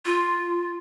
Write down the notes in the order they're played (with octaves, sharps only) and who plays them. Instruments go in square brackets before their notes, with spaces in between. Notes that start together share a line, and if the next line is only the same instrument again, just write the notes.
[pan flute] F4